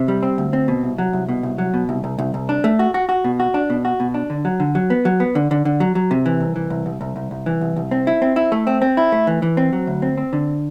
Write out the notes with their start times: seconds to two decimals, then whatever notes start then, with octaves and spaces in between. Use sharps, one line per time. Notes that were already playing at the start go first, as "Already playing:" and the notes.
Already playing: C3
0.08 G3
0.23 C4
0.38 D2
0.53 C4
0.68 B2
0.83 C2
0.98 F#3
1.13 C2
1.29 B2
1.43 C2
1.58 F#3
1.74 B2
1.89 C2
2.04 C2
2.19 C2
2.34 C2
2.49 D4
2.64 A3
2.79 F#4
2.94 F#4
3.09 F#4
3.24 B2
3.40 F#4
3.54 D4
3.70 B2
3.85 F#4
4.00 B2
4.14 D4
4.30 D3
4.45 F#3
4.60 D3
4.75 F#3
4.90 B3
5.05 F#3
5.20 B3
5.35 D3
5.51 D3
5.65 D3
5.80 F#3
5.95 F#3
6.11 C3
6.26 E3
6.41 C2
6.56 E3
6.70 C2
6.86 C2
7.01 C2
7.16 C2
7.31 C2
7.46 E3
7.61 C2
7.76 C2
7.91 C4
8.07 E4
8.22 C4
8.36 E4
8.52 A3
8.67 C4
8.82 C4
8.97 E4
9.12 A3
9.27 E3
9.42 E3
9.57 C4
9.73 F#3
9.87 D2
10.02 C4
10.17 C4
10.33 D3